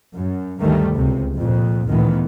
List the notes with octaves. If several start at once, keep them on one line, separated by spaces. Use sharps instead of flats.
F#2
D2 G2 D#3 G3 A3
C#2 C3
F2 A#2
D2 A#2 D#3 E3 B3